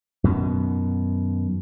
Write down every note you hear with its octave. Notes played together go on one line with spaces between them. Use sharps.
F#2 B2 D#3